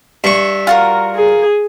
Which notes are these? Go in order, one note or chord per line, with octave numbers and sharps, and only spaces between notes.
G2 E5 C#6
F4 F#4 A#4
G#4